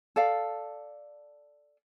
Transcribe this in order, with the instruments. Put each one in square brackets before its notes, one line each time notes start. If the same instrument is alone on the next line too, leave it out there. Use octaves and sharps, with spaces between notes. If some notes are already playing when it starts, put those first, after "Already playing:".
[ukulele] A4 D5 F5